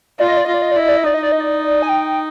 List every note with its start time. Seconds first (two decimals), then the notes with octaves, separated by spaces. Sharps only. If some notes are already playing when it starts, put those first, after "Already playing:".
0.19 F4 D5
0.28 D#5
0.37 D5
0.45 F4 D#5
0.54 D5
0.62 D#5
0.71 D5
0.76 E4 D#5
0.88 D5
0.97 D#5
1.04 D#4 D5
1.14 D#5
1.23 D5
1.32 D#5
1.40 D5
1.82 G#5
1.89 G5